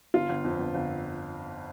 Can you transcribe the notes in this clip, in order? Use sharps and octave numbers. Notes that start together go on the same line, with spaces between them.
G1 F4
G1
F2
G1
G1